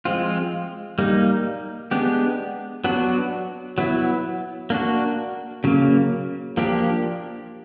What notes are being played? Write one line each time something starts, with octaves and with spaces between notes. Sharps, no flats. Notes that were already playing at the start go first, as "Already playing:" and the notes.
F3 G#3 C4 F4
G3 A#3 D#4
G#3 B3 D4 G4
F#3 B3 D4 F#4
F#3 B3 E4
A#3 D4 F#4
C#3 F#3 A#3
F3 A#3 D4 G4